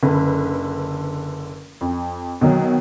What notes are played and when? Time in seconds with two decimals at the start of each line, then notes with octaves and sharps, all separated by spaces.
0.03 F#1 D3 B4
1.81 F2
2.41 B2 D#3 F#3